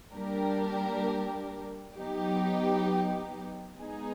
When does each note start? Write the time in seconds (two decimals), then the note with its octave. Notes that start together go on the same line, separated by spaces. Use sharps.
0.14 G3 A#3 D4 G4 A#4
1.97 F#3 B3 D#4 G4
3.78 G#3 B3 D#4 G#4